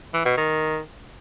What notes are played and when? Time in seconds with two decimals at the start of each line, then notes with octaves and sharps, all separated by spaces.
0.14 E3
0.26 B2
0.37 D#3